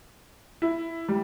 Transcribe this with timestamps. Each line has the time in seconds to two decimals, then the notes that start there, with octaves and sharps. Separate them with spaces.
0.62 E4
1.08 G3